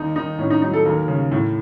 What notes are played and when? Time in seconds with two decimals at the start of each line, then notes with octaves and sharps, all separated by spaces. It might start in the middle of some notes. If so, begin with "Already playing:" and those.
Already playing: D#2 D#3 D#4
0.16 D#3 D#4
0.39 A2 C#4
0.50 D#4
0.62 F#3 D#4
0.74 A4
0.85 D#2 A#4
1.08 C#3
1.32 A2